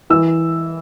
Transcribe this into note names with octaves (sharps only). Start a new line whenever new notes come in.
E3 E6